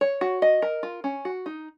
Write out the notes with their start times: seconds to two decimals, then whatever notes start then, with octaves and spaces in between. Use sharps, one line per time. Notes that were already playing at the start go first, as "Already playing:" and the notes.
0.01 C#5
0.21 F#4
0.42 D#5
0.62 A#4
0.83 F4
1.04 C#4
1.25 F#4
1.46 D#4